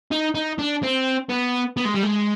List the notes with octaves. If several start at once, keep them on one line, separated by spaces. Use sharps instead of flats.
D#4
D#4
D4
C4
B3
B3
G#3
G3
G#3